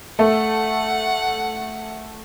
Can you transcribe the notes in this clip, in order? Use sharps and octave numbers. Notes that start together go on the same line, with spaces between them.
A3 F#5